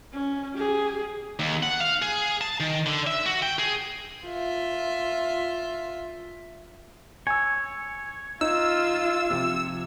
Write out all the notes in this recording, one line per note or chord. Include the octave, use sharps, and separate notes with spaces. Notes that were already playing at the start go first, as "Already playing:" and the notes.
C#4
G4 G#4
D#2
F#5
F5
G#4
A5
D#3
D3
E5
F#4
G5
G#4
F4 E5
C#5 G#5 E6
D#4 F4 E6
C3 F3